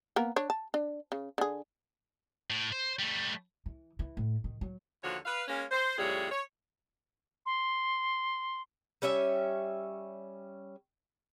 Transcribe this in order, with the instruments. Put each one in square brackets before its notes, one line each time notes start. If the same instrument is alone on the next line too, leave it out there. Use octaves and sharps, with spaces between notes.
[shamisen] A#3 B3 A#4
D4 C#5
A5
D4
C#3
D3 G#4
[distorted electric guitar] A2
C5
G3 A3
[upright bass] E3
E3
A2
D#3
F#3
[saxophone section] D#2 D3 F3 F#4 C#5
B4 F5
G#3 A#3 C#4
C5
F2 A2 G3 G#4 C#5
C#5
[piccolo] C6
[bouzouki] G3 C#4 C#5 E5